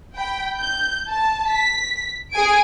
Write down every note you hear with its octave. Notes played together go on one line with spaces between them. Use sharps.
G5 B5
G6
A5
B6
G#4 G#5 D7